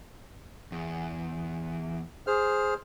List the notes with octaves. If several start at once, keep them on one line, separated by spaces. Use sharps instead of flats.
E2
G#4 C5 F6